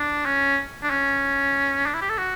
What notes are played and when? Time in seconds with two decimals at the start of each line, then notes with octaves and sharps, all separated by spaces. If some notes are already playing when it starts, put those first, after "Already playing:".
Already playing: D4
0.25 C#4
0.83 D4
0.90 C#4
1.86 D4
1.94 E4
2.01 G4
2.09 A4
2.18 F#4